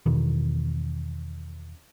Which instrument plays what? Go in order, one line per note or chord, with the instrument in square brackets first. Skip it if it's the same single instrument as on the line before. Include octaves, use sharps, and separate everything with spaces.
[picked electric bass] E2 B2 D#3